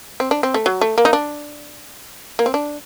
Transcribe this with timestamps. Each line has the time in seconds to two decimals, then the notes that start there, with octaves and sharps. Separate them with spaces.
0.20 C4
0.31 D4
0.43 C4
0.54 A3
0.66 F#3
0.81 A3
0.98 A#3
1.05 D#4
1.13 D4
2.39 A#3
2.46 C4
2.54 D4